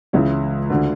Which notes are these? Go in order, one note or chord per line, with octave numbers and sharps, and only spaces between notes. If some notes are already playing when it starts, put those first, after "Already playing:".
C#2 C#3 E3 E4
D2 D3